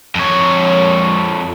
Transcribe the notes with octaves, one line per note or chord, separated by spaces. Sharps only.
F2 C#5